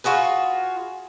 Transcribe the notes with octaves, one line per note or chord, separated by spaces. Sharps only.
F4 F#4 G#4 B4